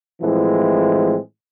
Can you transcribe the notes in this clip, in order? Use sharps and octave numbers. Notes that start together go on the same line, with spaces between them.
A2 E3 F3 G#3 C4